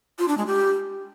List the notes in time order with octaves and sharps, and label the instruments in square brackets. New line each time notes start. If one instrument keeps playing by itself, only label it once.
[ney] F4
D4
G#3
G4